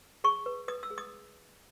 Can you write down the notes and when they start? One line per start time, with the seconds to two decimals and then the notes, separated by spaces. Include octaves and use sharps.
0.24 G#4 C#6
0.46 B4
0.68 B4 D#6
0.83 E6
0.90 G#4
0.98 D#6